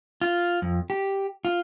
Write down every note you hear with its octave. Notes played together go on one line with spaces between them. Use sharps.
F4
F2
G4
F4